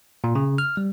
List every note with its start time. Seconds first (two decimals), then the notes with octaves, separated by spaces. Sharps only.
0.24 A#2
0.35 C#3
0.58 F6
0.77 G3